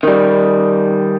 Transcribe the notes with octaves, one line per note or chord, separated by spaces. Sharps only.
D#3 G3